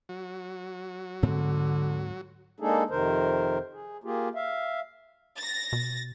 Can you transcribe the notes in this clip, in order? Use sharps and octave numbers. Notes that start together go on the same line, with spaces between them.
F#3
D2 G#2 D3 C4
G#3 A#3 D4 D#4 G#4 A4
F2 C3 D#3 A#4 C5
G#4
A#3 F4 G4 G#4
E5 F5
A6 A#6
B2